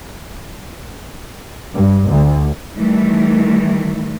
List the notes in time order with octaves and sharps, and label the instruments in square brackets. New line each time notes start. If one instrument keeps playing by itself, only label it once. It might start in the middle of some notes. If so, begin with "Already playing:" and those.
[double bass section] G2
D2
[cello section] D#3 E3 G3 A3